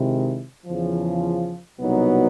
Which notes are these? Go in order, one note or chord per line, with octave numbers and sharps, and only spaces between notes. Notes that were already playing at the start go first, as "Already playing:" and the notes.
Already playing: C3 D#3 G#3 C4 E4
E2 C#3 F3
C2 B2 F#3 B3 D#4